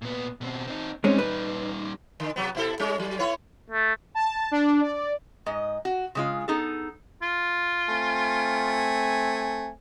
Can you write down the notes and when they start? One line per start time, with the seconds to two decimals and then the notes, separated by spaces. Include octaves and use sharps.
0.02 A#2 B3
0.41 B2 C4
0.67 C4 D#4
1.04 G3 G#3 C4 C#4 D#4
1.19 B4
2.20 D3
2.36 C3 F#3 B3
2.55 B2 E4 A4
2.79 G3 C#4
2.99 F#3
3.19 B3 E4 C#5
3.70 A3
4.15 A5
4.51 D4
4.81 D5
5.46 G#2 D#5
5.85 F#4
6.15 C#3 G#3 F4
6.48 B3 D#4 G#4 A4
7.22 F4
7.88 A3 C4 G#5